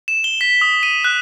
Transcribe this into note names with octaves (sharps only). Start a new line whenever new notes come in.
E7
G7
B6
D#6
D#7
F#6